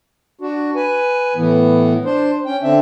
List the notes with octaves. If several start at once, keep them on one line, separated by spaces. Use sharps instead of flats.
D4 F#4
B4 G#5
A2 E3 B3
D4 C5
C#4 G5
D3 C4 D4 E5